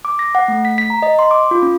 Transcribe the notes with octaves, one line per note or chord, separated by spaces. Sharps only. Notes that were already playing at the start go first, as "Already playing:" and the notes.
D6
A#6
F#5
A3
B6
B6
A#5
D#5
C6
D6
F4
C#4